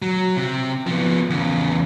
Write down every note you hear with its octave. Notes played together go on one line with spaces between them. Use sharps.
F#3
C3
F3 B3
E2 C#3